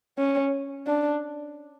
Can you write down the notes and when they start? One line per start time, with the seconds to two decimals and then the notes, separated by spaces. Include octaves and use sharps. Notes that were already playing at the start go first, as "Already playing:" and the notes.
0.18 C#4
0.87 D4